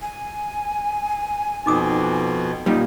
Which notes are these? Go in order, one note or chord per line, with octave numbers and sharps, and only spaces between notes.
G#5
F2 B2 D#4 D6 D#6
A#2 G3 D#4